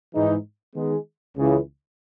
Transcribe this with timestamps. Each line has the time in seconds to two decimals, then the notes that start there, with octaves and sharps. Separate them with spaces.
0.14 G#2 E3 G#3 D#4
0.74 D#3 G#3 B3 D#4 G#4
1.37 C#2 C#3 E3